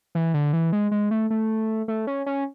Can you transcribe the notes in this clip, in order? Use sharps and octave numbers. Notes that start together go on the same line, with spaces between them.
E3
D3
E3
G#3
G#3
A3
A3
A3
C#4
C#4